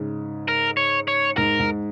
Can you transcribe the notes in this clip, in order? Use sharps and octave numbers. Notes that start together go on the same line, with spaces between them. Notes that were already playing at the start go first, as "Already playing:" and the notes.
Already playing: G#2 C#3
A#4
C#5
C#5
G#2 A#4
G#2